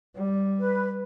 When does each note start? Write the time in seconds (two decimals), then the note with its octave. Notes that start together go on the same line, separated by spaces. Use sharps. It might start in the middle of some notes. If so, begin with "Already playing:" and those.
0.17 G3
0.59 B4